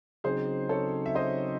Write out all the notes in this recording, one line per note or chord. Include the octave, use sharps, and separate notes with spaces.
C#3 F#3 C4 D#4 G#4 C5
A4 C#5
E5
C5 D#5